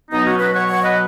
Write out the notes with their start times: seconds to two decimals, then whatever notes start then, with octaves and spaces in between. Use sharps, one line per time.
0.11 B2 F#3 B3 D#4
0.26 C#4 F#4
0.39 F#4 B4
0.54 C#5 F#5
0.68 C#5 F#5
0.83 B4 D#5